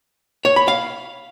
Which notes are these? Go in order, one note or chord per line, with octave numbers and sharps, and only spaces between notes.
C#5
B5
F5